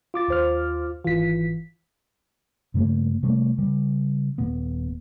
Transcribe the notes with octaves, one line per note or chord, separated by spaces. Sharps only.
F4 D6 A6
D#2 C5 F6
G#1 E3 F4 B6
G2 C#3 A3 A#3
C3 G3 A3 A#3
C#3 G3
D#1 A#2 B3